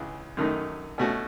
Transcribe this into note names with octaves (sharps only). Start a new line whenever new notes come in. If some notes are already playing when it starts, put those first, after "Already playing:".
Already playing: C#2 C#3 E3
F#2 D#3 A3 D#4
B2 A3 C#4 F#4